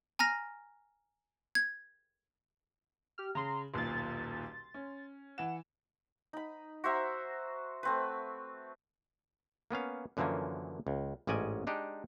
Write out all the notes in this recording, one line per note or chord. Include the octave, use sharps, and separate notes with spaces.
G#5 A#5 F6 A#6
G#6
G4 F6
C#3 A#5 C6
D#1 B1 A#2 C6 A6
C#4
E3 F#5 E7
D#4 B5
F#4 C5 E5 A#5
A3 C4 B4
A#3 B3 C#4 F5
F#2 D3 E3 F3 A#3 C#4
C#2
A1 G#2 C#4 D5 D#5 G#5
G#3 D4 D#4 G4